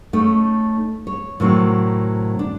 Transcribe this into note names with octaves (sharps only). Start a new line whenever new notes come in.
A3 C#4 D#4
C#5
A2 C3 D#3 F#3
D4